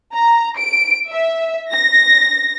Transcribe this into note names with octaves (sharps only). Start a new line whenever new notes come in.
A#5
D7
E5
A#6